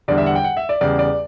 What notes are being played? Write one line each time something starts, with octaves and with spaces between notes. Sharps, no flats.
E2 D3 G3 D5
E5
F#5
G5
F#5
E5
D5
E2 C#3 G3 D5
D5